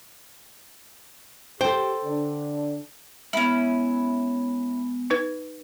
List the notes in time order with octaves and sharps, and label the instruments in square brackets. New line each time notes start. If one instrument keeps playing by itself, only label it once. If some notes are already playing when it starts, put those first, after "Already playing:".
[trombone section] G4 [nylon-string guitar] A4 G5 [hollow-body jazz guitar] C5
[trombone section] D3 D4
[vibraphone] G#3 B3 [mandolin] C#4 E4
[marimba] D#4 B4 G#6